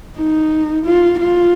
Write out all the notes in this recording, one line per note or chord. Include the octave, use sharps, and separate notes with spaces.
D#4
F4
F4